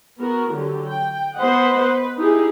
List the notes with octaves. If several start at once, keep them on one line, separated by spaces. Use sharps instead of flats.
B3 F#4 A#4
D3 F#3 G4
G5
B3 B4 C5 D#5 F#5
B4
D#4 E4 G4 G#4